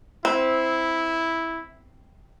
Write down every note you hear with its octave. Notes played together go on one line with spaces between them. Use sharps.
C4 E4